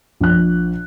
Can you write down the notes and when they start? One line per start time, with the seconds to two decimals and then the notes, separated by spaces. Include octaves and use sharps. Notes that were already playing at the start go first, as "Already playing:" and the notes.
0.20 A#1 F#6